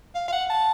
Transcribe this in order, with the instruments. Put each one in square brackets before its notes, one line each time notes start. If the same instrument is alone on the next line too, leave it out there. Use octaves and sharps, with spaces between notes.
[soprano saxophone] F5
F5
F#5
A5